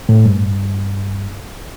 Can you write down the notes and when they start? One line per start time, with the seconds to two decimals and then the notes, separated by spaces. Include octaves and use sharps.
0.09 A2
0.26 G2